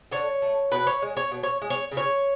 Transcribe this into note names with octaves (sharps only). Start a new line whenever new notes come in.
D3 C#5
A3
B2 B4
C#5
G#3
C#5
B2
C#5
G#3
C#5
C#3
C#5